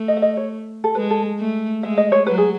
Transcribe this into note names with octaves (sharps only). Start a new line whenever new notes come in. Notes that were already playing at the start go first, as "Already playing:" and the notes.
Already playing: A3
D#5
E5
D#5
C#5
A4
G#3 B4
A4
A3
G#3 E5
D#5
C#5
F#3 B4
G#4